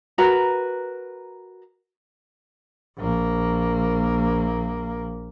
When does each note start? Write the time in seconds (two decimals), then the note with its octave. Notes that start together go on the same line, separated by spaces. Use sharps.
0.18 F#4 A#4 B4 A#5
2.97 A#1 A#3